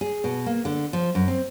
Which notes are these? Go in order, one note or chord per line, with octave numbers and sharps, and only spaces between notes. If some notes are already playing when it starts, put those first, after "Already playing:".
G#4
B2
A#3
D3
F3
F#2
C4